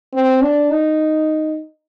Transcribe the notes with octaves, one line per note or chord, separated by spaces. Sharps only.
C4
D4
D#4